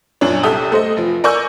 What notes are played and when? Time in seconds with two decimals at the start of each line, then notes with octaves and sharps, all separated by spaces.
0.21 F#2 A#2 D4 C#5
0.43 C2 C3 G4 A4 D#6
0.72 A3 C5 D#5
0.97 F1 F3
1.24 A#4 D5 G#5 C#6 E6 G6